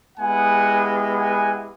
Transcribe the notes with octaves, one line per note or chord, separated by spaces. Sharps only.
G#3 B3 E4 G4 F#5 G#5
F#5 G#5